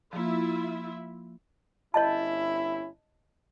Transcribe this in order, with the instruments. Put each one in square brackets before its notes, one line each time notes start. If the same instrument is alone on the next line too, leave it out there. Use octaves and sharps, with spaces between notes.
[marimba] F3 A#3 [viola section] E4 F4 E5
[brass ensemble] G1 C#4 E4 [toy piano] C#5 D#5 A5